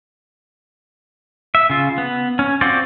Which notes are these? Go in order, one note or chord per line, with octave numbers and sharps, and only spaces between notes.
E5
C#3 F4
B3
C#4
C4 F4 F#4 C5 D5